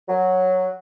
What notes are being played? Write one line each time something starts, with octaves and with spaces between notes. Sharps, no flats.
F#3